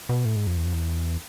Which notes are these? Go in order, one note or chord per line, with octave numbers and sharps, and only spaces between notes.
B2
A2
G#2
F2
E2
F2
E2